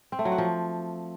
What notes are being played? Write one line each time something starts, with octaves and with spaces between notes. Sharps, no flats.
C4
A3
F#3
F#4
F3